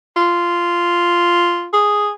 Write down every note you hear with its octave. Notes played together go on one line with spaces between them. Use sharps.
F4
G#4